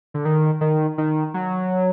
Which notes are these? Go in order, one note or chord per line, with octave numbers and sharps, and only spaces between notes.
D3
D#3
D#3
D#3
F#3